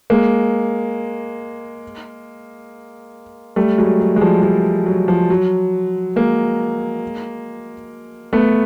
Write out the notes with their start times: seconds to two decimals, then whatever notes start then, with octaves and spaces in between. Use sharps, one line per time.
0.10 G#3 A#3
3.56 G3 A3
3.78 F#3 G#3
4.00 F#3
4.16 G#3
4.21 F3 G3
4.43 F3 G3
4.86 F#3
5.08 F3
5.30 F#3
6.16 G#3 A#3
8.33 A3 B3